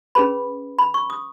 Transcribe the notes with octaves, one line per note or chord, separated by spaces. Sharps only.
C#4 G#4 B4 B5
B5
C#6
D#6